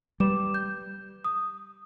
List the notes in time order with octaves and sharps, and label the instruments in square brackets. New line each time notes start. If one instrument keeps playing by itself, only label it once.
[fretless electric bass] G3 [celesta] B4 D6 E7
[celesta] G6
D#6